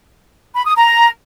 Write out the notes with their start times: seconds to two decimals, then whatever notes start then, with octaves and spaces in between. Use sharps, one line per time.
0.54 B5
0.65 D#6
0.76 A#5